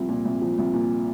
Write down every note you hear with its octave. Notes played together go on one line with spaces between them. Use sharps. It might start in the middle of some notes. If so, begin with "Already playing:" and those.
Already playing: C2 F3
A#2
C2
F3
C2
A#2